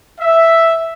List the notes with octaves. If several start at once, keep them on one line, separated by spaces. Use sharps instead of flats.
E5